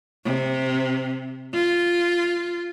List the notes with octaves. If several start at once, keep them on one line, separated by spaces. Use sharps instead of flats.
C3
F4